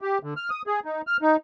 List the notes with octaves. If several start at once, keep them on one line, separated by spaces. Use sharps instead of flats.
G4
D3
F6
D#6
G#4
D#4
F6
D#4